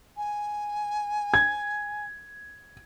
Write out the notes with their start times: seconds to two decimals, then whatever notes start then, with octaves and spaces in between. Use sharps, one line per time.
0.17 G#5
1.34 G#6